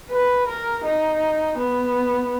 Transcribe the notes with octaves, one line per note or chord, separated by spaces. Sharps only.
B4
A#4
D#4
B3